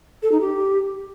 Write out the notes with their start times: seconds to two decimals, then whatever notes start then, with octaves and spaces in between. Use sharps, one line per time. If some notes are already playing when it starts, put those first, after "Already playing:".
0.23 A4
0.32 D#4
0.41 G4